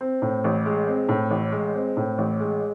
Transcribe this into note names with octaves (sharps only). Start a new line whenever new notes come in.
C4
A2
A1
G#3
C4
A2
A1
G#3
C4
A2
A1
G#3